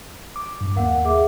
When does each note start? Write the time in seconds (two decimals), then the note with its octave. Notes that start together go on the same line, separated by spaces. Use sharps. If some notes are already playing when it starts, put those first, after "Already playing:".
0.36 D6
0.61 G2
0.76 D#2 A#3 A#4 F5 F#5
1.05 G#4 E5 D6